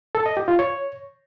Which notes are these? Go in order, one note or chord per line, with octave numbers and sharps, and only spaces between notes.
A4
D#5
G4
F4
C#5